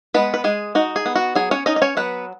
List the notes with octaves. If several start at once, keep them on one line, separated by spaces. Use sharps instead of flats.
G#3 B3 B4
B4
G#3 G#4
D#4 F#4
G#4
B3
F#4
F#3 G#4
C#4 C#5
C#4 D#4 D#5
D#5
C#4 C#5
F#3 B3 B4